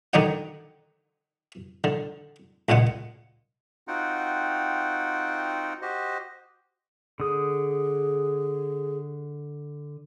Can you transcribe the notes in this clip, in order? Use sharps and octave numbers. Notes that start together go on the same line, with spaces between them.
D3 D#3 D#4 D5 F#5
D3
C#2 A#2 G#3 F#5
C4 D#4 F4 F#4 F#5 G5
F#4 G4 C5 D#5
D3 G#4 D#6